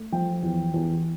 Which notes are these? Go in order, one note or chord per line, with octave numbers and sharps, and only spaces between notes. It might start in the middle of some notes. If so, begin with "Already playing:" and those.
Already playing: A3
F3 G5
E2
E2